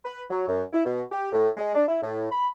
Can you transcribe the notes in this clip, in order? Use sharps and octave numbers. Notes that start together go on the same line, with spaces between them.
B4
F#3
F#2
E4
B2
G4
A2
G#3
D4
E4
A2
B5